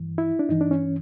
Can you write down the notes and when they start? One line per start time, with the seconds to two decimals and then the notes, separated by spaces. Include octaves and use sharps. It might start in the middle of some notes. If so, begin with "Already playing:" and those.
Already playing: G2 E3
0.18 E4
0.39 D4
0.49 G2 E3 D#4
0.61 D4
0.71 C#4